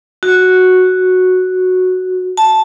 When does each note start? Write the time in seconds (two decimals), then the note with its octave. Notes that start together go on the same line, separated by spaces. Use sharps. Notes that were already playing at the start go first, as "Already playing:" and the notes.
0.23 F#4
2.37 A5